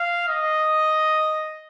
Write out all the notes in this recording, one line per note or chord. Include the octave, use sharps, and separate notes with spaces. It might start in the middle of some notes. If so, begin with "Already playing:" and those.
Already playing: F5
D#5